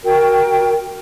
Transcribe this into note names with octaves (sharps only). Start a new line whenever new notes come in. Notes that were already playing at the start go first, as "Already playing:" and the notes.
F#4 A#4 G5